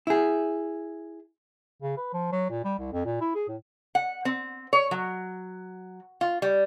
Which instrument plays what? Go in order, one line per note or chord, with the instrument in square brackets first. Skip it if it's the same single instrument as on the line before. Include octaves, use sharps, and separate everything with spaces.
[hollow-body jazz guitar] E4 G#4
[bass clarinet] C#3
B4
F3
F#3
A#2
G3
C2
F2
A#2
E4
G#4
A2
[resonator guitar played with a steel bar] F#5
C4
C#5
F#3
F4
G3